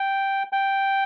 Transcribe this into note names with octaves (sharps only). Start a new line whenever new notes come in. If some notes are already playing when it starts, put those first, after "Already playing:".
Already playing: G5
G5